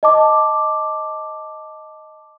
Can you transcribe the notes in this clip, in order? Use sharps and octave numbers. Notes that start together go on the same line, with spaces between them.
D#5 A5 D6